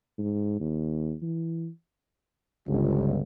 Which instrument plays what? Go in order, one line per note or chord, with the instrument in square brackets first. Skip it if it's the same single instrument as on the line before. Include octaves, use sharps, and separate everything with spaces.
[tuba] G#2
D#2
E3
[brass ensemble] G1 C#2